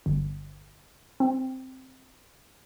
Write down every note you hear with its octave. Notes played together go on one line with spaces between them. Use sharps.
G1
C4